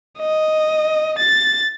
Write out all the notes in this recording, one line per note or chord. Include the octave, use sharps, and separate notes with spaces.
D#5
A6